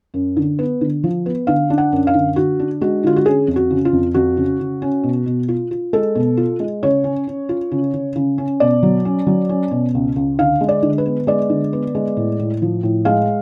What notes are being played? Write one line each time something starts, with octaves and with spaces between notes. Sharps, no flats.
F#2
D3
B3
D3
F3
B3
D3 F5
D4
F#5
F#2
F5
D3
D3 F#4
D4
G#3 F#4
D3 F4
F#4
C#4 G#4
F2
F#4
C#3
F4
F2
F2 F#4
C#3
C#3
C#4
B2
B2
F4
F4
G#3 A4
B2
F4
G#3
C#3 C#5
C#4
C#4
F4
C#3
C#3
C#3
C#4
B2 D5
F#3
C#4
F#3
C#4
B2
C#2
C#2
D3 F5
G#3
D5
D3
B4
B3
G#3 D5
D3
B3
G#3
A2
A2
F3
A2
G#3 F5